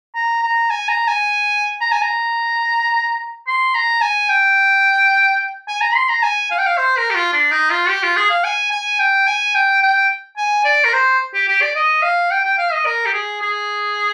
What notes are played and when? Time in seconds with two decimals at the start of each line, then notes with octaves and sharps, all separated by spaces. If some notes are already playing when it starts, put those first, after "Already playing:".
0.15 A#5
0.43 A#5
0.70 G#5
0.88 A#5
1.08 G#5
1.81 A#5
1.92 G#5
2.02 A#5
3.47 C6
3.74 A#5
4.02 G#5
4.29 G5
5.68 G#5
5.81 A#5
5.95 C6
6.09 A#5
6.23 G#5
6.51 F5
6.59 G5
6.66 F5
6.78 C5
6.97 A#4
7.10 G4
7.15 F4
7.33 D4
7.51 D#4
7.71 F4
7.88 G4
8.03 F4
8.17 G#4
8.30 F5
8.44 G#5
8.71 G#5
8.99 G5
9.27 G#5
9.55 G5
9.82 G5
10.37 G#5
10.65 D5
10.84 A#4
10.93 C5
11.34 G4
11.48 G4
11.62 D5
11.76 D#5
12.02 F5
12.31 G5
12.45 G5
12.58 F5
12.72 D#5
12.86 A#4
13.06 G4
13.14 G#4
13.41 G#4